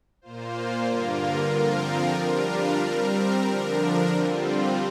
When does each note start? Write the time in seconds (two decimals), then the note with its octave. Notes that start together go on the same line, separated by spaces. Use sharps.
0.21 A#2 A#3 F4 C5
0.87 G2 D3 A#3 F4 A#4
1.52 D3 F3 C4 F4 A#4
2.18 G3 D4 F4 A#4
2.83 G3 C4 A#4
3.48 D3 F3 D4 A#4
4.13 D3 G3 C4 F4